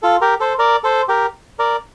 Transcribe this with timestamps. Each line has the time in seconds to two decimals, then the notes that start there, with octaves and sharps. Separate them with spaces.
0.03 F4 A4
0.21 G4 A#4
0.40 A4 C5
0.59 A#4 D5
0.84 A4 C5
1.08 G4 A#4
1.59 A#4 D5